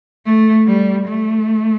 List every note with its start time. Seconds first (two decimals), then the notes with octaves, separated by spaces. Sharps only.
0.26 A3
0.67 G3
1.07 A3